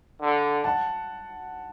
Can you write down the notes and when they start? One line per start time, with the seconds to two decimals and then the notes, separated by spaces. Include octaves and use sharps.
0.20 D3
0.64 F#5 A5